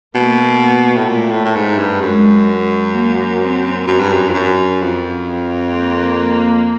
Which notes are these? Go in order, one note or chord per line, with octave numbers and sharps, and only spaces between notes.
B2 A#3
A2
A#2 A3
A2
A2
G#2
G2
F#2 G#3
A#3
C4
F#2
G2
F#2
F2
F#2
F2
A#3